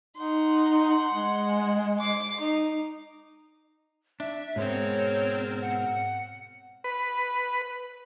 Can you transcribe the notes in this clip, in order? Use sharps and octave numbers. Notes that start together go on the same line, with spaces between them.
D#4 F#5 C6
G#3
D6 C7
D#4
D4 E5
G#2 B2 G#3 C4 A#4 C#5
F#5
B4